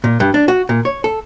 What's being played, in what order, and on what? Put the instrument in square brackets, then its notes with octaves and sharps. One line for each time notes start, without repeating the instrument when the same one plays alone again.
[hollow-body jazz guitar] A#2
G2
D4
F#4
A#2
C#5
A4